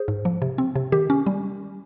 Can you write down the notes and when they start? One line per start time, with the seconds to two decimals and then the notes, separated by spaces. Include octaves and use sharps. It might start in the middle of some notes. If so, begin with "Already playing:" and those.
Already playing: G#4 C5
0.08 G#2
0.25 F3
0.42 C3
0.58 C4
0.76 C3
0.92 D#3 G4
1.10 C#4
1.26 G3